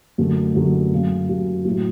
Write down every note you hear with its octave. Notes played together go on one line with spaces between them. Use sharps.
F#2 D3 F#3 A3
F#2 D3 F#3 A3
F#2 C#3 F#3
F#2 C#3 F#3
A2 F#3